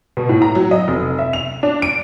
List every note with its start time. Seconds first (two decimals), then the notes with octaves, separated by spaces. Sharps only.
0.17 B2
0.29 A2
0.42 A#5
0.55 F#3
0.71 D#5
0.88 F1
1.18 E5
1.33 F7
1.63 D4
1.82 D7